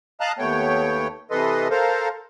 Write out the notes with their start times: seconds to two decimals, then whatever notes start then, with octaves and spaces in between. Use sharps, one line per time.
0.21 D#5 F5 A5 A#5 F#6
0.39 D#2 A3 B3 C#5 G5
1.31 C3 E3 A4 B4 D#5 C6
1.70 A4 A#4 C5 F5